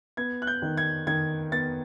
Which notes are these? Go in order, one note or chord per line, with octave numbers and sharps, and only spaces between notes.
B3 G#6
F#6
G6
D#3
G#6
D#3 G#6
B3 A6